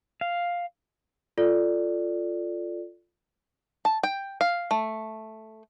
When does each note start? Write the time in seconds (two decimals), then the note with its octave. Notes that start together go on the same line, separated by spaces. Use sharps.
0.21 F5
1.38 F4 A4 D5
3.85 A5
4.03 G5
4.41 F5
4.71 A3